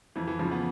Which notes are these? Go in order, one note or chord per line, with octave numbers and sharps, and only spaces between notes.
F2 E3
E3
C#3 E3 F3
B3